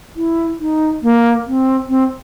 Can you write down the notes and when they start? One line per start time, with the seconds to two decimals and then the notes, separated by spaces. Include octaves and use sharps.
0.16 E4
0.60 D#4
1.03 A#3
1.46 C4
1.89 C4